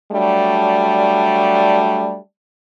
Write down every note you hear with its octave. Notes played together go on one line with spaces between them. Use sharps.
F#3 G3 A3 D4